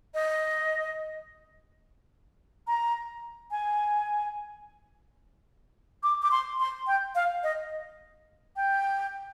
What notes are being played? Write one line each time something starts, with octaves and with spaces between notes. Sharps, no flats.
D#5
A#5
G#5
D6
D6
C6
C6
G5
F5
D#5
G5